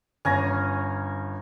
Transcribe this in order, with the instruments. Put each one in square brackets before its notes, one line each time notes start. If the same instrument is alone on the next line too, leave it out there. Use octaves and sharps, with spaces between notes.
[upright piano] G1 [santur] C#4 G#5 A#5